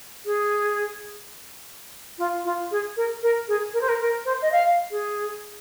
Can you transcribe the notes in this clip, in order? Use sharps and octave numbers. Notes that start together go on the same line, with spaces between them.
G#4
F4
F4
G#4
A#4
A#4
G#4
A#4
C5
A#4
A#4
C5
D#5
F5
G#4